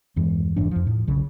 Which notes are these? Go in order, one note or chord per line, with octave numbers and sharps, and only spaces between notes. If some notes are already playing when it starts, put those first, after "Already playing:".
E2 G2 E3 G#3
F1 G#2 E3 D4
F2 F3
A2
B1 C#3